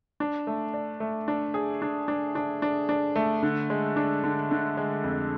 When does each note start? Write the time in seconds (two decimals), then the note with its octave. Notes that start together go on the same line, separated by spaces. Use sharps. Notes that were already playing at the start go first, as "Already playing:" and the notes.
0.20 D4
0.47 A3
0.74 D5
1.00 A3
1.28 D4
1.54 G#4
1.82 D4
2.08 D4
2.35 D4
2.62 D4
2.89 D4
3.16 A3
3.43 D3
3.70 G#3
3.96 D4
4.24 D3
4.51 D3
4.77 G#3
5.04 F2